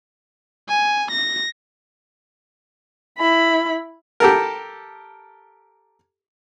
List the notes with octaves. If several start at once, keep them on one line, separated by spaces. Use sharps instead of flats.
G#5
A#6
E4 B5
G4 A4 A#4